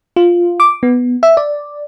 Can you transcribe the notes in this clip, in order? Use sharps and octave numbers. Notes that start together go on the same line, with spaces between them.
F4
D6
B3
E5
D5